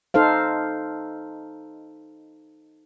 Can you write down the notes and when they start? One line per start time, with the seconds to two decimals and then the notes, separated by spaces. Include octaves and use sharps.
0.14 D#4 A4 C5 F5